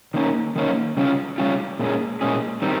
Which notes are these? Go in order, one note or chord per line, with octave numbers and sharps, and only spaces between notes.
D#3 A#3 C#4
D#3 A#3 C#4
C#3 G3 C#4 F4
C#3 G3 C#4 F4
A#2 G#3 C#4 G#4
A#2 G#3 C#4 G#4
D#3 G3 C4